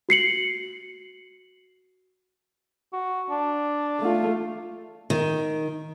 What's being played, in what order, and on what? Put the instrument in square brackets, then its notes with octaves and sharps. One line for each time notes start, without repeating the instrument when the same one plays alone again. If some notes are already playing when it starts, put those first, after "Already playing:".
[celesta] F#4 C7 C#7 F#7
[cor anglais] F#4
D4
[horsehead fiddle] A3 F4
[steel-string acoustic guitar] D#3